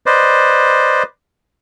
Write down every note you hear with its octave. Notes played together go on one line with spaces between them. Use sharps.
B4 C5 D5 D#5